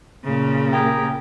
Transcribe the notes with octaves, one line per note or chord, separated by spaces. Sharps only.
A#2 C#3
G4 G#4 A#4